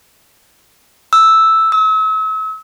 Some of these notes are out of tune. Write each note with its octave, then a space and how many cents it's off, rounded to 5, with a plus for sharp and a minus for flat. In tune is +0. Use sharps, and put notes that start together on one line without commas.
E6 -5
E6 -40